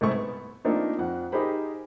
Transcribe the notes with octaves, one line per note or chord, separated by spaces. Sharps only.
C2 G#2 A3 C#6
B3
F3 A3 A#3 C4 D4 D#4
F2 F#5
D#4 G4 G#4 A#4 C5 B5